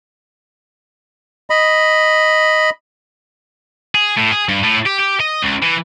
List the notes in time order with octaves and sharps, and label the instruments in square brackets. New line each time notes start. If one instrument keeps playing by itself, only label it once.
[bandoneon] D#5 B5
[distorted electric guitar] G#4
A2
G#4
G2
A2
G4
G4
D#5
C#2
E3